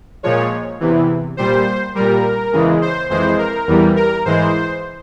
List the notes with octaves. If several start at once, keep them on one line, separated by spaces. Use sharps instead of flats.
A#2 F3 G#3 C#5
E2 C3 E3
A#2 G3 C5
A#2 G3 A#4
E2 C#3 E3 G#3
C5
F2 E3 G#3 C5
A#4
E2 E3 G3
A#4
G#2 E3 G#3 C5